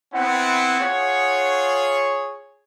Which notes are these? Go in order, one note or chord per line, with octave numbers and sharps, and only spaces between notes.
B3 C4 E4 F#5
F4 G#4 C#5